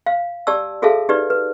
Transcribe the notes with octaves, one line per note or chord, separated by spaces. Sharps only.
F5
G4 D5 A5 E6
F#4 G#4 A4 E5 F5 A5
D#4 G4 B4 D5
B4